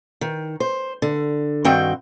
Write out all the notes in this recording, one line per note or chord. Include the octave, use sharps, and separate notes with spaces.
D#3
C5
D3
G2 D#3 C4 F#4 G5